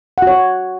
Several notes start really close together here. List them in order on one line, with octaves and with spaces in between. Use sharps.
F#5 F#4 C#5